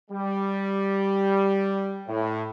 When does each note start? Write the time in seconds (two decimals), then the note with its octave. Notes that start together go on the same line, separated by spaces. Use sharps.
0.10 G3
2.07 A2